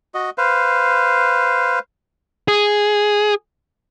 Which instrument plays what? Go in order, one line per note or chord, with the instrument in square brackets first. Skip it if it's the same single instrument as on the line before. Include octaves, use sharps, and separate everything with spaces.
[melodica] F#4 D#5
B4 C5 F5
[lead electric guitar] G#4